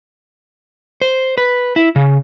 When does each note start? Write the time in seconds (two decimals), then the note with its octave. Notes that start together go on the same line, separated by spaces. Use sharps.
1.02 C5
1.38 B4
1.76 E4
1.96 C#3